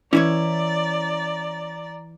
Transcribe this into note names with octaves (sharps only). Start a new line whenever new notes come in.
E3 C#4 E4 C#5 D5 A#5